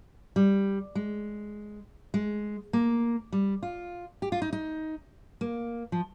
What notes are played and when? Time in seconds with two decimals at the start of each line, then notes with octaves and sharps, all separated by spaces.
0.36 G3
0.95 G#3
2.14 G#3
2.73 A#3
3.33 G3
3.63 F4
4.22 G4
4.32 F4
4.42 D#4
4.53 D#4
5.41 A#3
5.92 F3